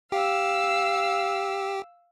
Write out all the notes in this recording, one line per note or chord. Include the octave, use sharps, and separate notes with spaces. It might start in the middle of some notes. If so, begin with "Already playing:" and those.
G4 F5 E6